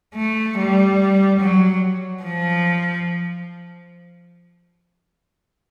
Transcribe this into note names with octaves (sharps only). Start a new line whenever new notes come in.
A3
G3
F#3
F3